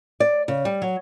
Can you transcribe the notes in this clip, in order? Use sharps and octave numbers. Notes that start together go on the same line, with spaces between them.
D5
C#3
G3
F#3